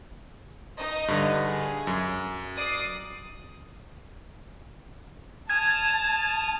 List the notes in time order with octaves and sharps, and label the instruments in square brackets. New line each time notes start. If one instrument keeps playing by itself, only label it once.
[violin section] D#4 D#5
[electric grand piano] G2 D3
[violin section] G#4
[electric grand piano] F#2
[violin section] D5 D#6 C7
[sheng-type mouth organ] G#5 D#6 F6 [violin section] A5 [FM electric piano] G#6